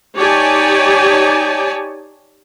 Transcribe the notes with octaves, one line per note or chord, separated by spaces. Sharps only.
D#4 G4 C#5 D5 G#5 A5